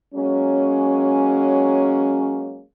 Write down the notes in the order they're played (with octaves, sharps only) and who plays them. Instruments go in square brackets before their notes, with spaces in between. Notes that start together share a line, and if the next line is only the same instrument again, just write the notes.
[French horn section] F#3 G#3 A#3 C#4